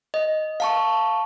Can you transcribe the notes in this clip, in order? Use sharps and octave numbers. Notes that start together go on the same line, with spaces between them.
D#5
F5 A5 C#6